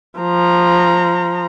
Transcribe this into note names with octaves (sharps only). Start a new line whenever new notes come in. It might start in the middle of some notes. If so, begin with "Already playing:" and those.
F3 A#5